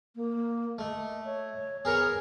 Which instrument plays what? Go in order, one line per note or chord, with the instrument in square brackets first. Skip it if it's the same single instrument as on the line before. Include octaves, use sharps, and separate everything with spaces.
[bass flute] A#3
[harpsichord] A3 [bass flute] D#5
[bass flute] C#5
[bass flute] B3 [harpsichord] G#4 A#4 C#5